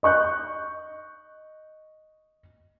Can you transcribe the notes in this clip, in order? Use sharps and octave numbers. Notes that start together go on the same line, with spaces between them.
D#5 C#6 F#6 G6